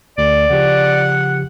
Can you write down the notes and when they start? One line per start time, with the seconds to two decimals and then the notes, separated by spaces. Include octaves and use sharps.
0.18 D2 D5
0.50 C#3 F3 G4 F#5